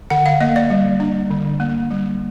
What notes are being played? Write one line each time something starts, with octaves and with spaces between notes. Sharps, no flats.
D3 F#5
F5
A#3 D#5
D5
G3
D4
D3
A#3
G3